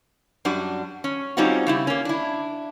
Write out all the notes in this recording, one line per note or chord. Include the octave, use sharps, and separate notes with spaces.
F#2 G3 D4 F#4
C#4
G3 C4 C#4 D#4 F4 F#4
C#3 G3 E4
A#3 C#4
D4 E4